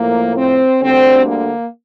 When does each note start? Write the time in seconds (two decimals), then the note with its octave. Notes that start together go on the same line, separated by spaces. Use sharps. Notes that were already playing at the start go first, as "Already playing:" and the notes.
Already playing: A2 F3 A#3
0.36 C4
0.81 D2 D3 G3 C4
1.26 A#3